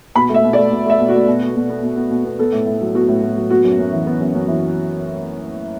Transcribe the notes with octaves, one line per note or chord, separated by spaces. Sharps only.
B2 B5
A3
E5
B2
D5
A3
B2
A3 E5
B2
F#4
A3
B2
B3
B2
B3
B2
B3
B2
B3
B3 A4
A2
A2
F#3
B3 F#4
A2
A2
F#3
B3 F#4
F#2
F#2
E3
B3
F#2
F#2
E3